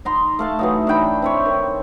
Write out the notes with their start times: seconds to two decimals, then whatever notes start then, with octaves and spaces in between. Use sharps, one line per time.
0.05 D#4 A#5 C6
0.39 A3 F5 A5
0.59 E3 F#3 D#4
0.87 D4 D#4 G5 B5
1.22 C4 E4 C#5
1.46 D#3